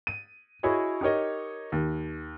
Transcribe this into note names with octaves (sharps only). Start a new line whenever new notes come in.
D#7
E4 F#4 G#4 C#5 D#5
D#4 G4 A#4 C#5 D#5
D#2